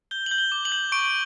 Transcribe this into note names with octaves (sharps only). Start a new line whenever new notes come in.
G6 G7
F#7
G6
G7
D6
F#7
G6
C#6 D7